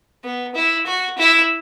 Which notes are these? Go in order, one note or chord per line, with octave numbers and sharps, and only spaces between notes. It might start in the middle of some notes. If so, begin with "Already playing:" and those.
B3
E4
F#4
E4